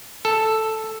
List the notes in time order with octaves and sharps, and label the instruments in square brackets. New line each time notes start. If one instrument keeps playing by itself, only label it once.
[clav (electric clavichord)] A4